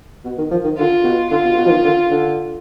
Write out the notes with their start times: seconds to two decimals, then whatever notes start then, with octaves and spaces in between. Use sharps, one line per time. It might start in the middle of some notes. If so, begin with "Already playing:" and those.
0.25 B2
0.38 D#3
0.51 F3
0.64 D#3
0.77 D3 F4
1.04 B2
1.30 D3 F4
1.44 B2
1.57 B2
1.66 F3
1.70 D#3
1.84 D3
2.11 D3